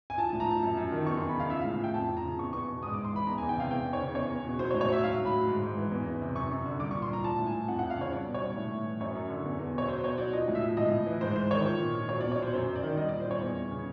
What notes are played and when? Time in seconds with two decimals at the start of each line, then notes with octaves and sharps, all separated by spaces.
0.10 G#5
0.18 F3 A5
0.29 A5
0.33 A2
0.40 A#5
0.47 F3 A5
0.63 F#2
0.77 F#2
0.92 D#3
1.06 E2 C#6
1.17 C6
1.21 E2
1.29 B5
1.36 C#3 F5
1.50 F3 E5
1.61 F5
1.65 A2
1.80 F3 G5
1.94 F2 A5
2.09 F2
2.17 A#5
2.24 C#3
2.39 E2 C#6
2.53 E2 C#6
2.68 B2
2.83 G#2 D#6
2.94 D6
2.97 G#2
3.05 C6
3.12 E3 B5
3.27 E2 A#5
3.38 G#5
3.42 E2
3.49 G5
3.56 C3 F5
3.71 E2 G5
3.86 E2
3.93 C#5
4.01 C#3
4.15 E2 C#5
4.30 E2
4.45 B2
4.59 F#3 C5
4.71 C#5
4.74 A2
4.81 C#5
4.89 F#3 E5
5.03 F#3 F5
5.18 A2
5.25 B5
5.33 F#3
5.47 G#2
5.62 G#2
5.77 E3
5.91 E2
6.06 E2
6.22 C3
6.36 F#2 C#6
6.51 F#2
6.66 D3
6.80 G3 D6
6.91 C#6
6.95 A#2
7.02 C6
7.09 G3 A#5
7.24 F3 A5
7.39 A2
7.46 G#5
7.54 F3
7.68 F2 F#5
7.79 F#5
7.83 F2
7.90 F5
7.97 C#3 C#5
8.12 G3 D5
8.26 B2
8.34 C#5
8.42 G3
8.56 A2
8.72 A2
8.86 E3
9.00 F#2 C#5
9.15 F#2
9.30 D3
9.45 E2
9.59 E2
9.74 B2 C#5
9.88 F#3 C5
10.04 B2 C#5
10.18 F#3 D5
10.33 F3 D#5
10.48 A2
10.55 E5
10.63 F3
10.77 A2 D#5
10.91 A2
11.07 E3
11.21 G#2 C5
11.36 G#2 C5
11.51 D#3 C#5
11.66 F3
11.80 A#2
11.95 F3
12.09 F#3 C#5
12.21 D5
12.24 B2
12.32 C#5
12.39 F#3 C5
12.53 F#2 C5
12.68 F#2
12.76 D5
12.83 D#3
12.97 G3 D#5
13.09 D5
13.12 A#2
13.20 C5
13.27 G3 C#5
13.41 E2
13.56 E2
13.71 C#3